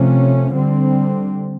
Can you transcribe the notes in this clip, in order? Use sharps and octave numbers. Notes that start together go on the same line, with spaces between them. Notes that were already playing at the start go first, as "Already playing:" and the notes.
Already playing: C3 F3 A3 C#4
D3 G3 C4